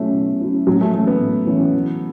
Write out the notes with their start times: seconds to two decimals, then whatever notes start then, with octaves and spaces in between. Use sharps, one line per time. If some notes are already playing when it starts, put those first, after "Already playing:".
Already playing: B2 F#3 A3 C#4 E4
0.14 B2
0.41 F#3 C#4 E4
0.67 A2 F#3
0.81 A3
0.94 E3 A3 C#4
1.07 B3
1.21 A2
1.47 E3 C#4
1.74 E3